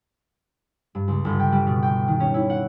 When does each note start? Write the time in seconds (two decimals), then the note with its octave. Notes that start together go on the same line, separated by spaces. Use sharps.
0.95 G2
1.08 C#2
1.25 G1
1.40 G5
1.52 G3
1.67 B2
1.83 G5
2.08 D#3
2.20 C#4
2.34 E4
2.50 F#5